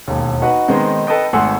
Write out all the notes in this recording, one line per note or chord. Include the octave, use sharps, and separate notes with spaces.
E1 D#2
D#4 F#4 B4 F#5
D#3 G#3 B3 C4 D#4
A4 B4 D#5 G5
G#1 A3 F#5 G#5 C6 E6